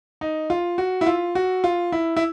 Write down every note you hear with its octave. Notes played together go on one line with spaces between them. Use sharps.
D#4
F4
F#4
E4
F4
F#4
F4
E4
E4